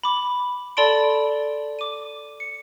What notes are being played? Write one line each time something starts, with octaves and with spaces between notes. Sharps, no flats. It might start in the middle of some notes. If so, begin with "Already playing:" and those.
B5 D6
A4 D5 A5 B5 C6 D7
D6 D#7
C#7